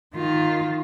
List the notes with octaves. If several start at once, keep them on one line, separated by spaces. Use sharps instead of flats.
D#3 F4